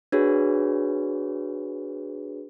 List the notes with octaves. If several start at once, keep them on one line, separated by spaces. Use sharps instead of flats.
D4 F#4 G#4 B4 C#5